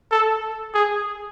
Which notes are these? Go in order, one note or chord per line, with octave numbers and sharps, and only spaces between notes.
A4
G#4